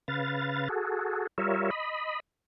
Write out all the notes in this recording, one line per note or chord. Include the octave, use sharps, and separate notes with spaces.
C#3 B4 F5 A6
F#4 G#4 A4
G3 F4 A#4 C#5 E5
D#5 B5